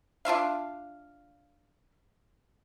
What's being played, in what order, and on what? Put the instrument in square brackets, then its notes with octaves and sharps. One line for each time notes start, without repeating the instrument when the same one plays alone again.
[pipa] D4 F4 E5 F5